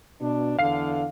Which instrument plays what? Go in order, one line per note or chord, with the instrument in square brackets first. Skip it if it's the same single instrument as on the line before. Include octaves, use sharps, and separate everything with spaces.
[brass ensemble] B2 D4
[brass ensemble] E2 D3 [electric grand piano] F5 C7